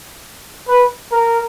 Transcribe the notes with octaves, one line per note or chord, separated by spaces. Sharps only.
B4
A#4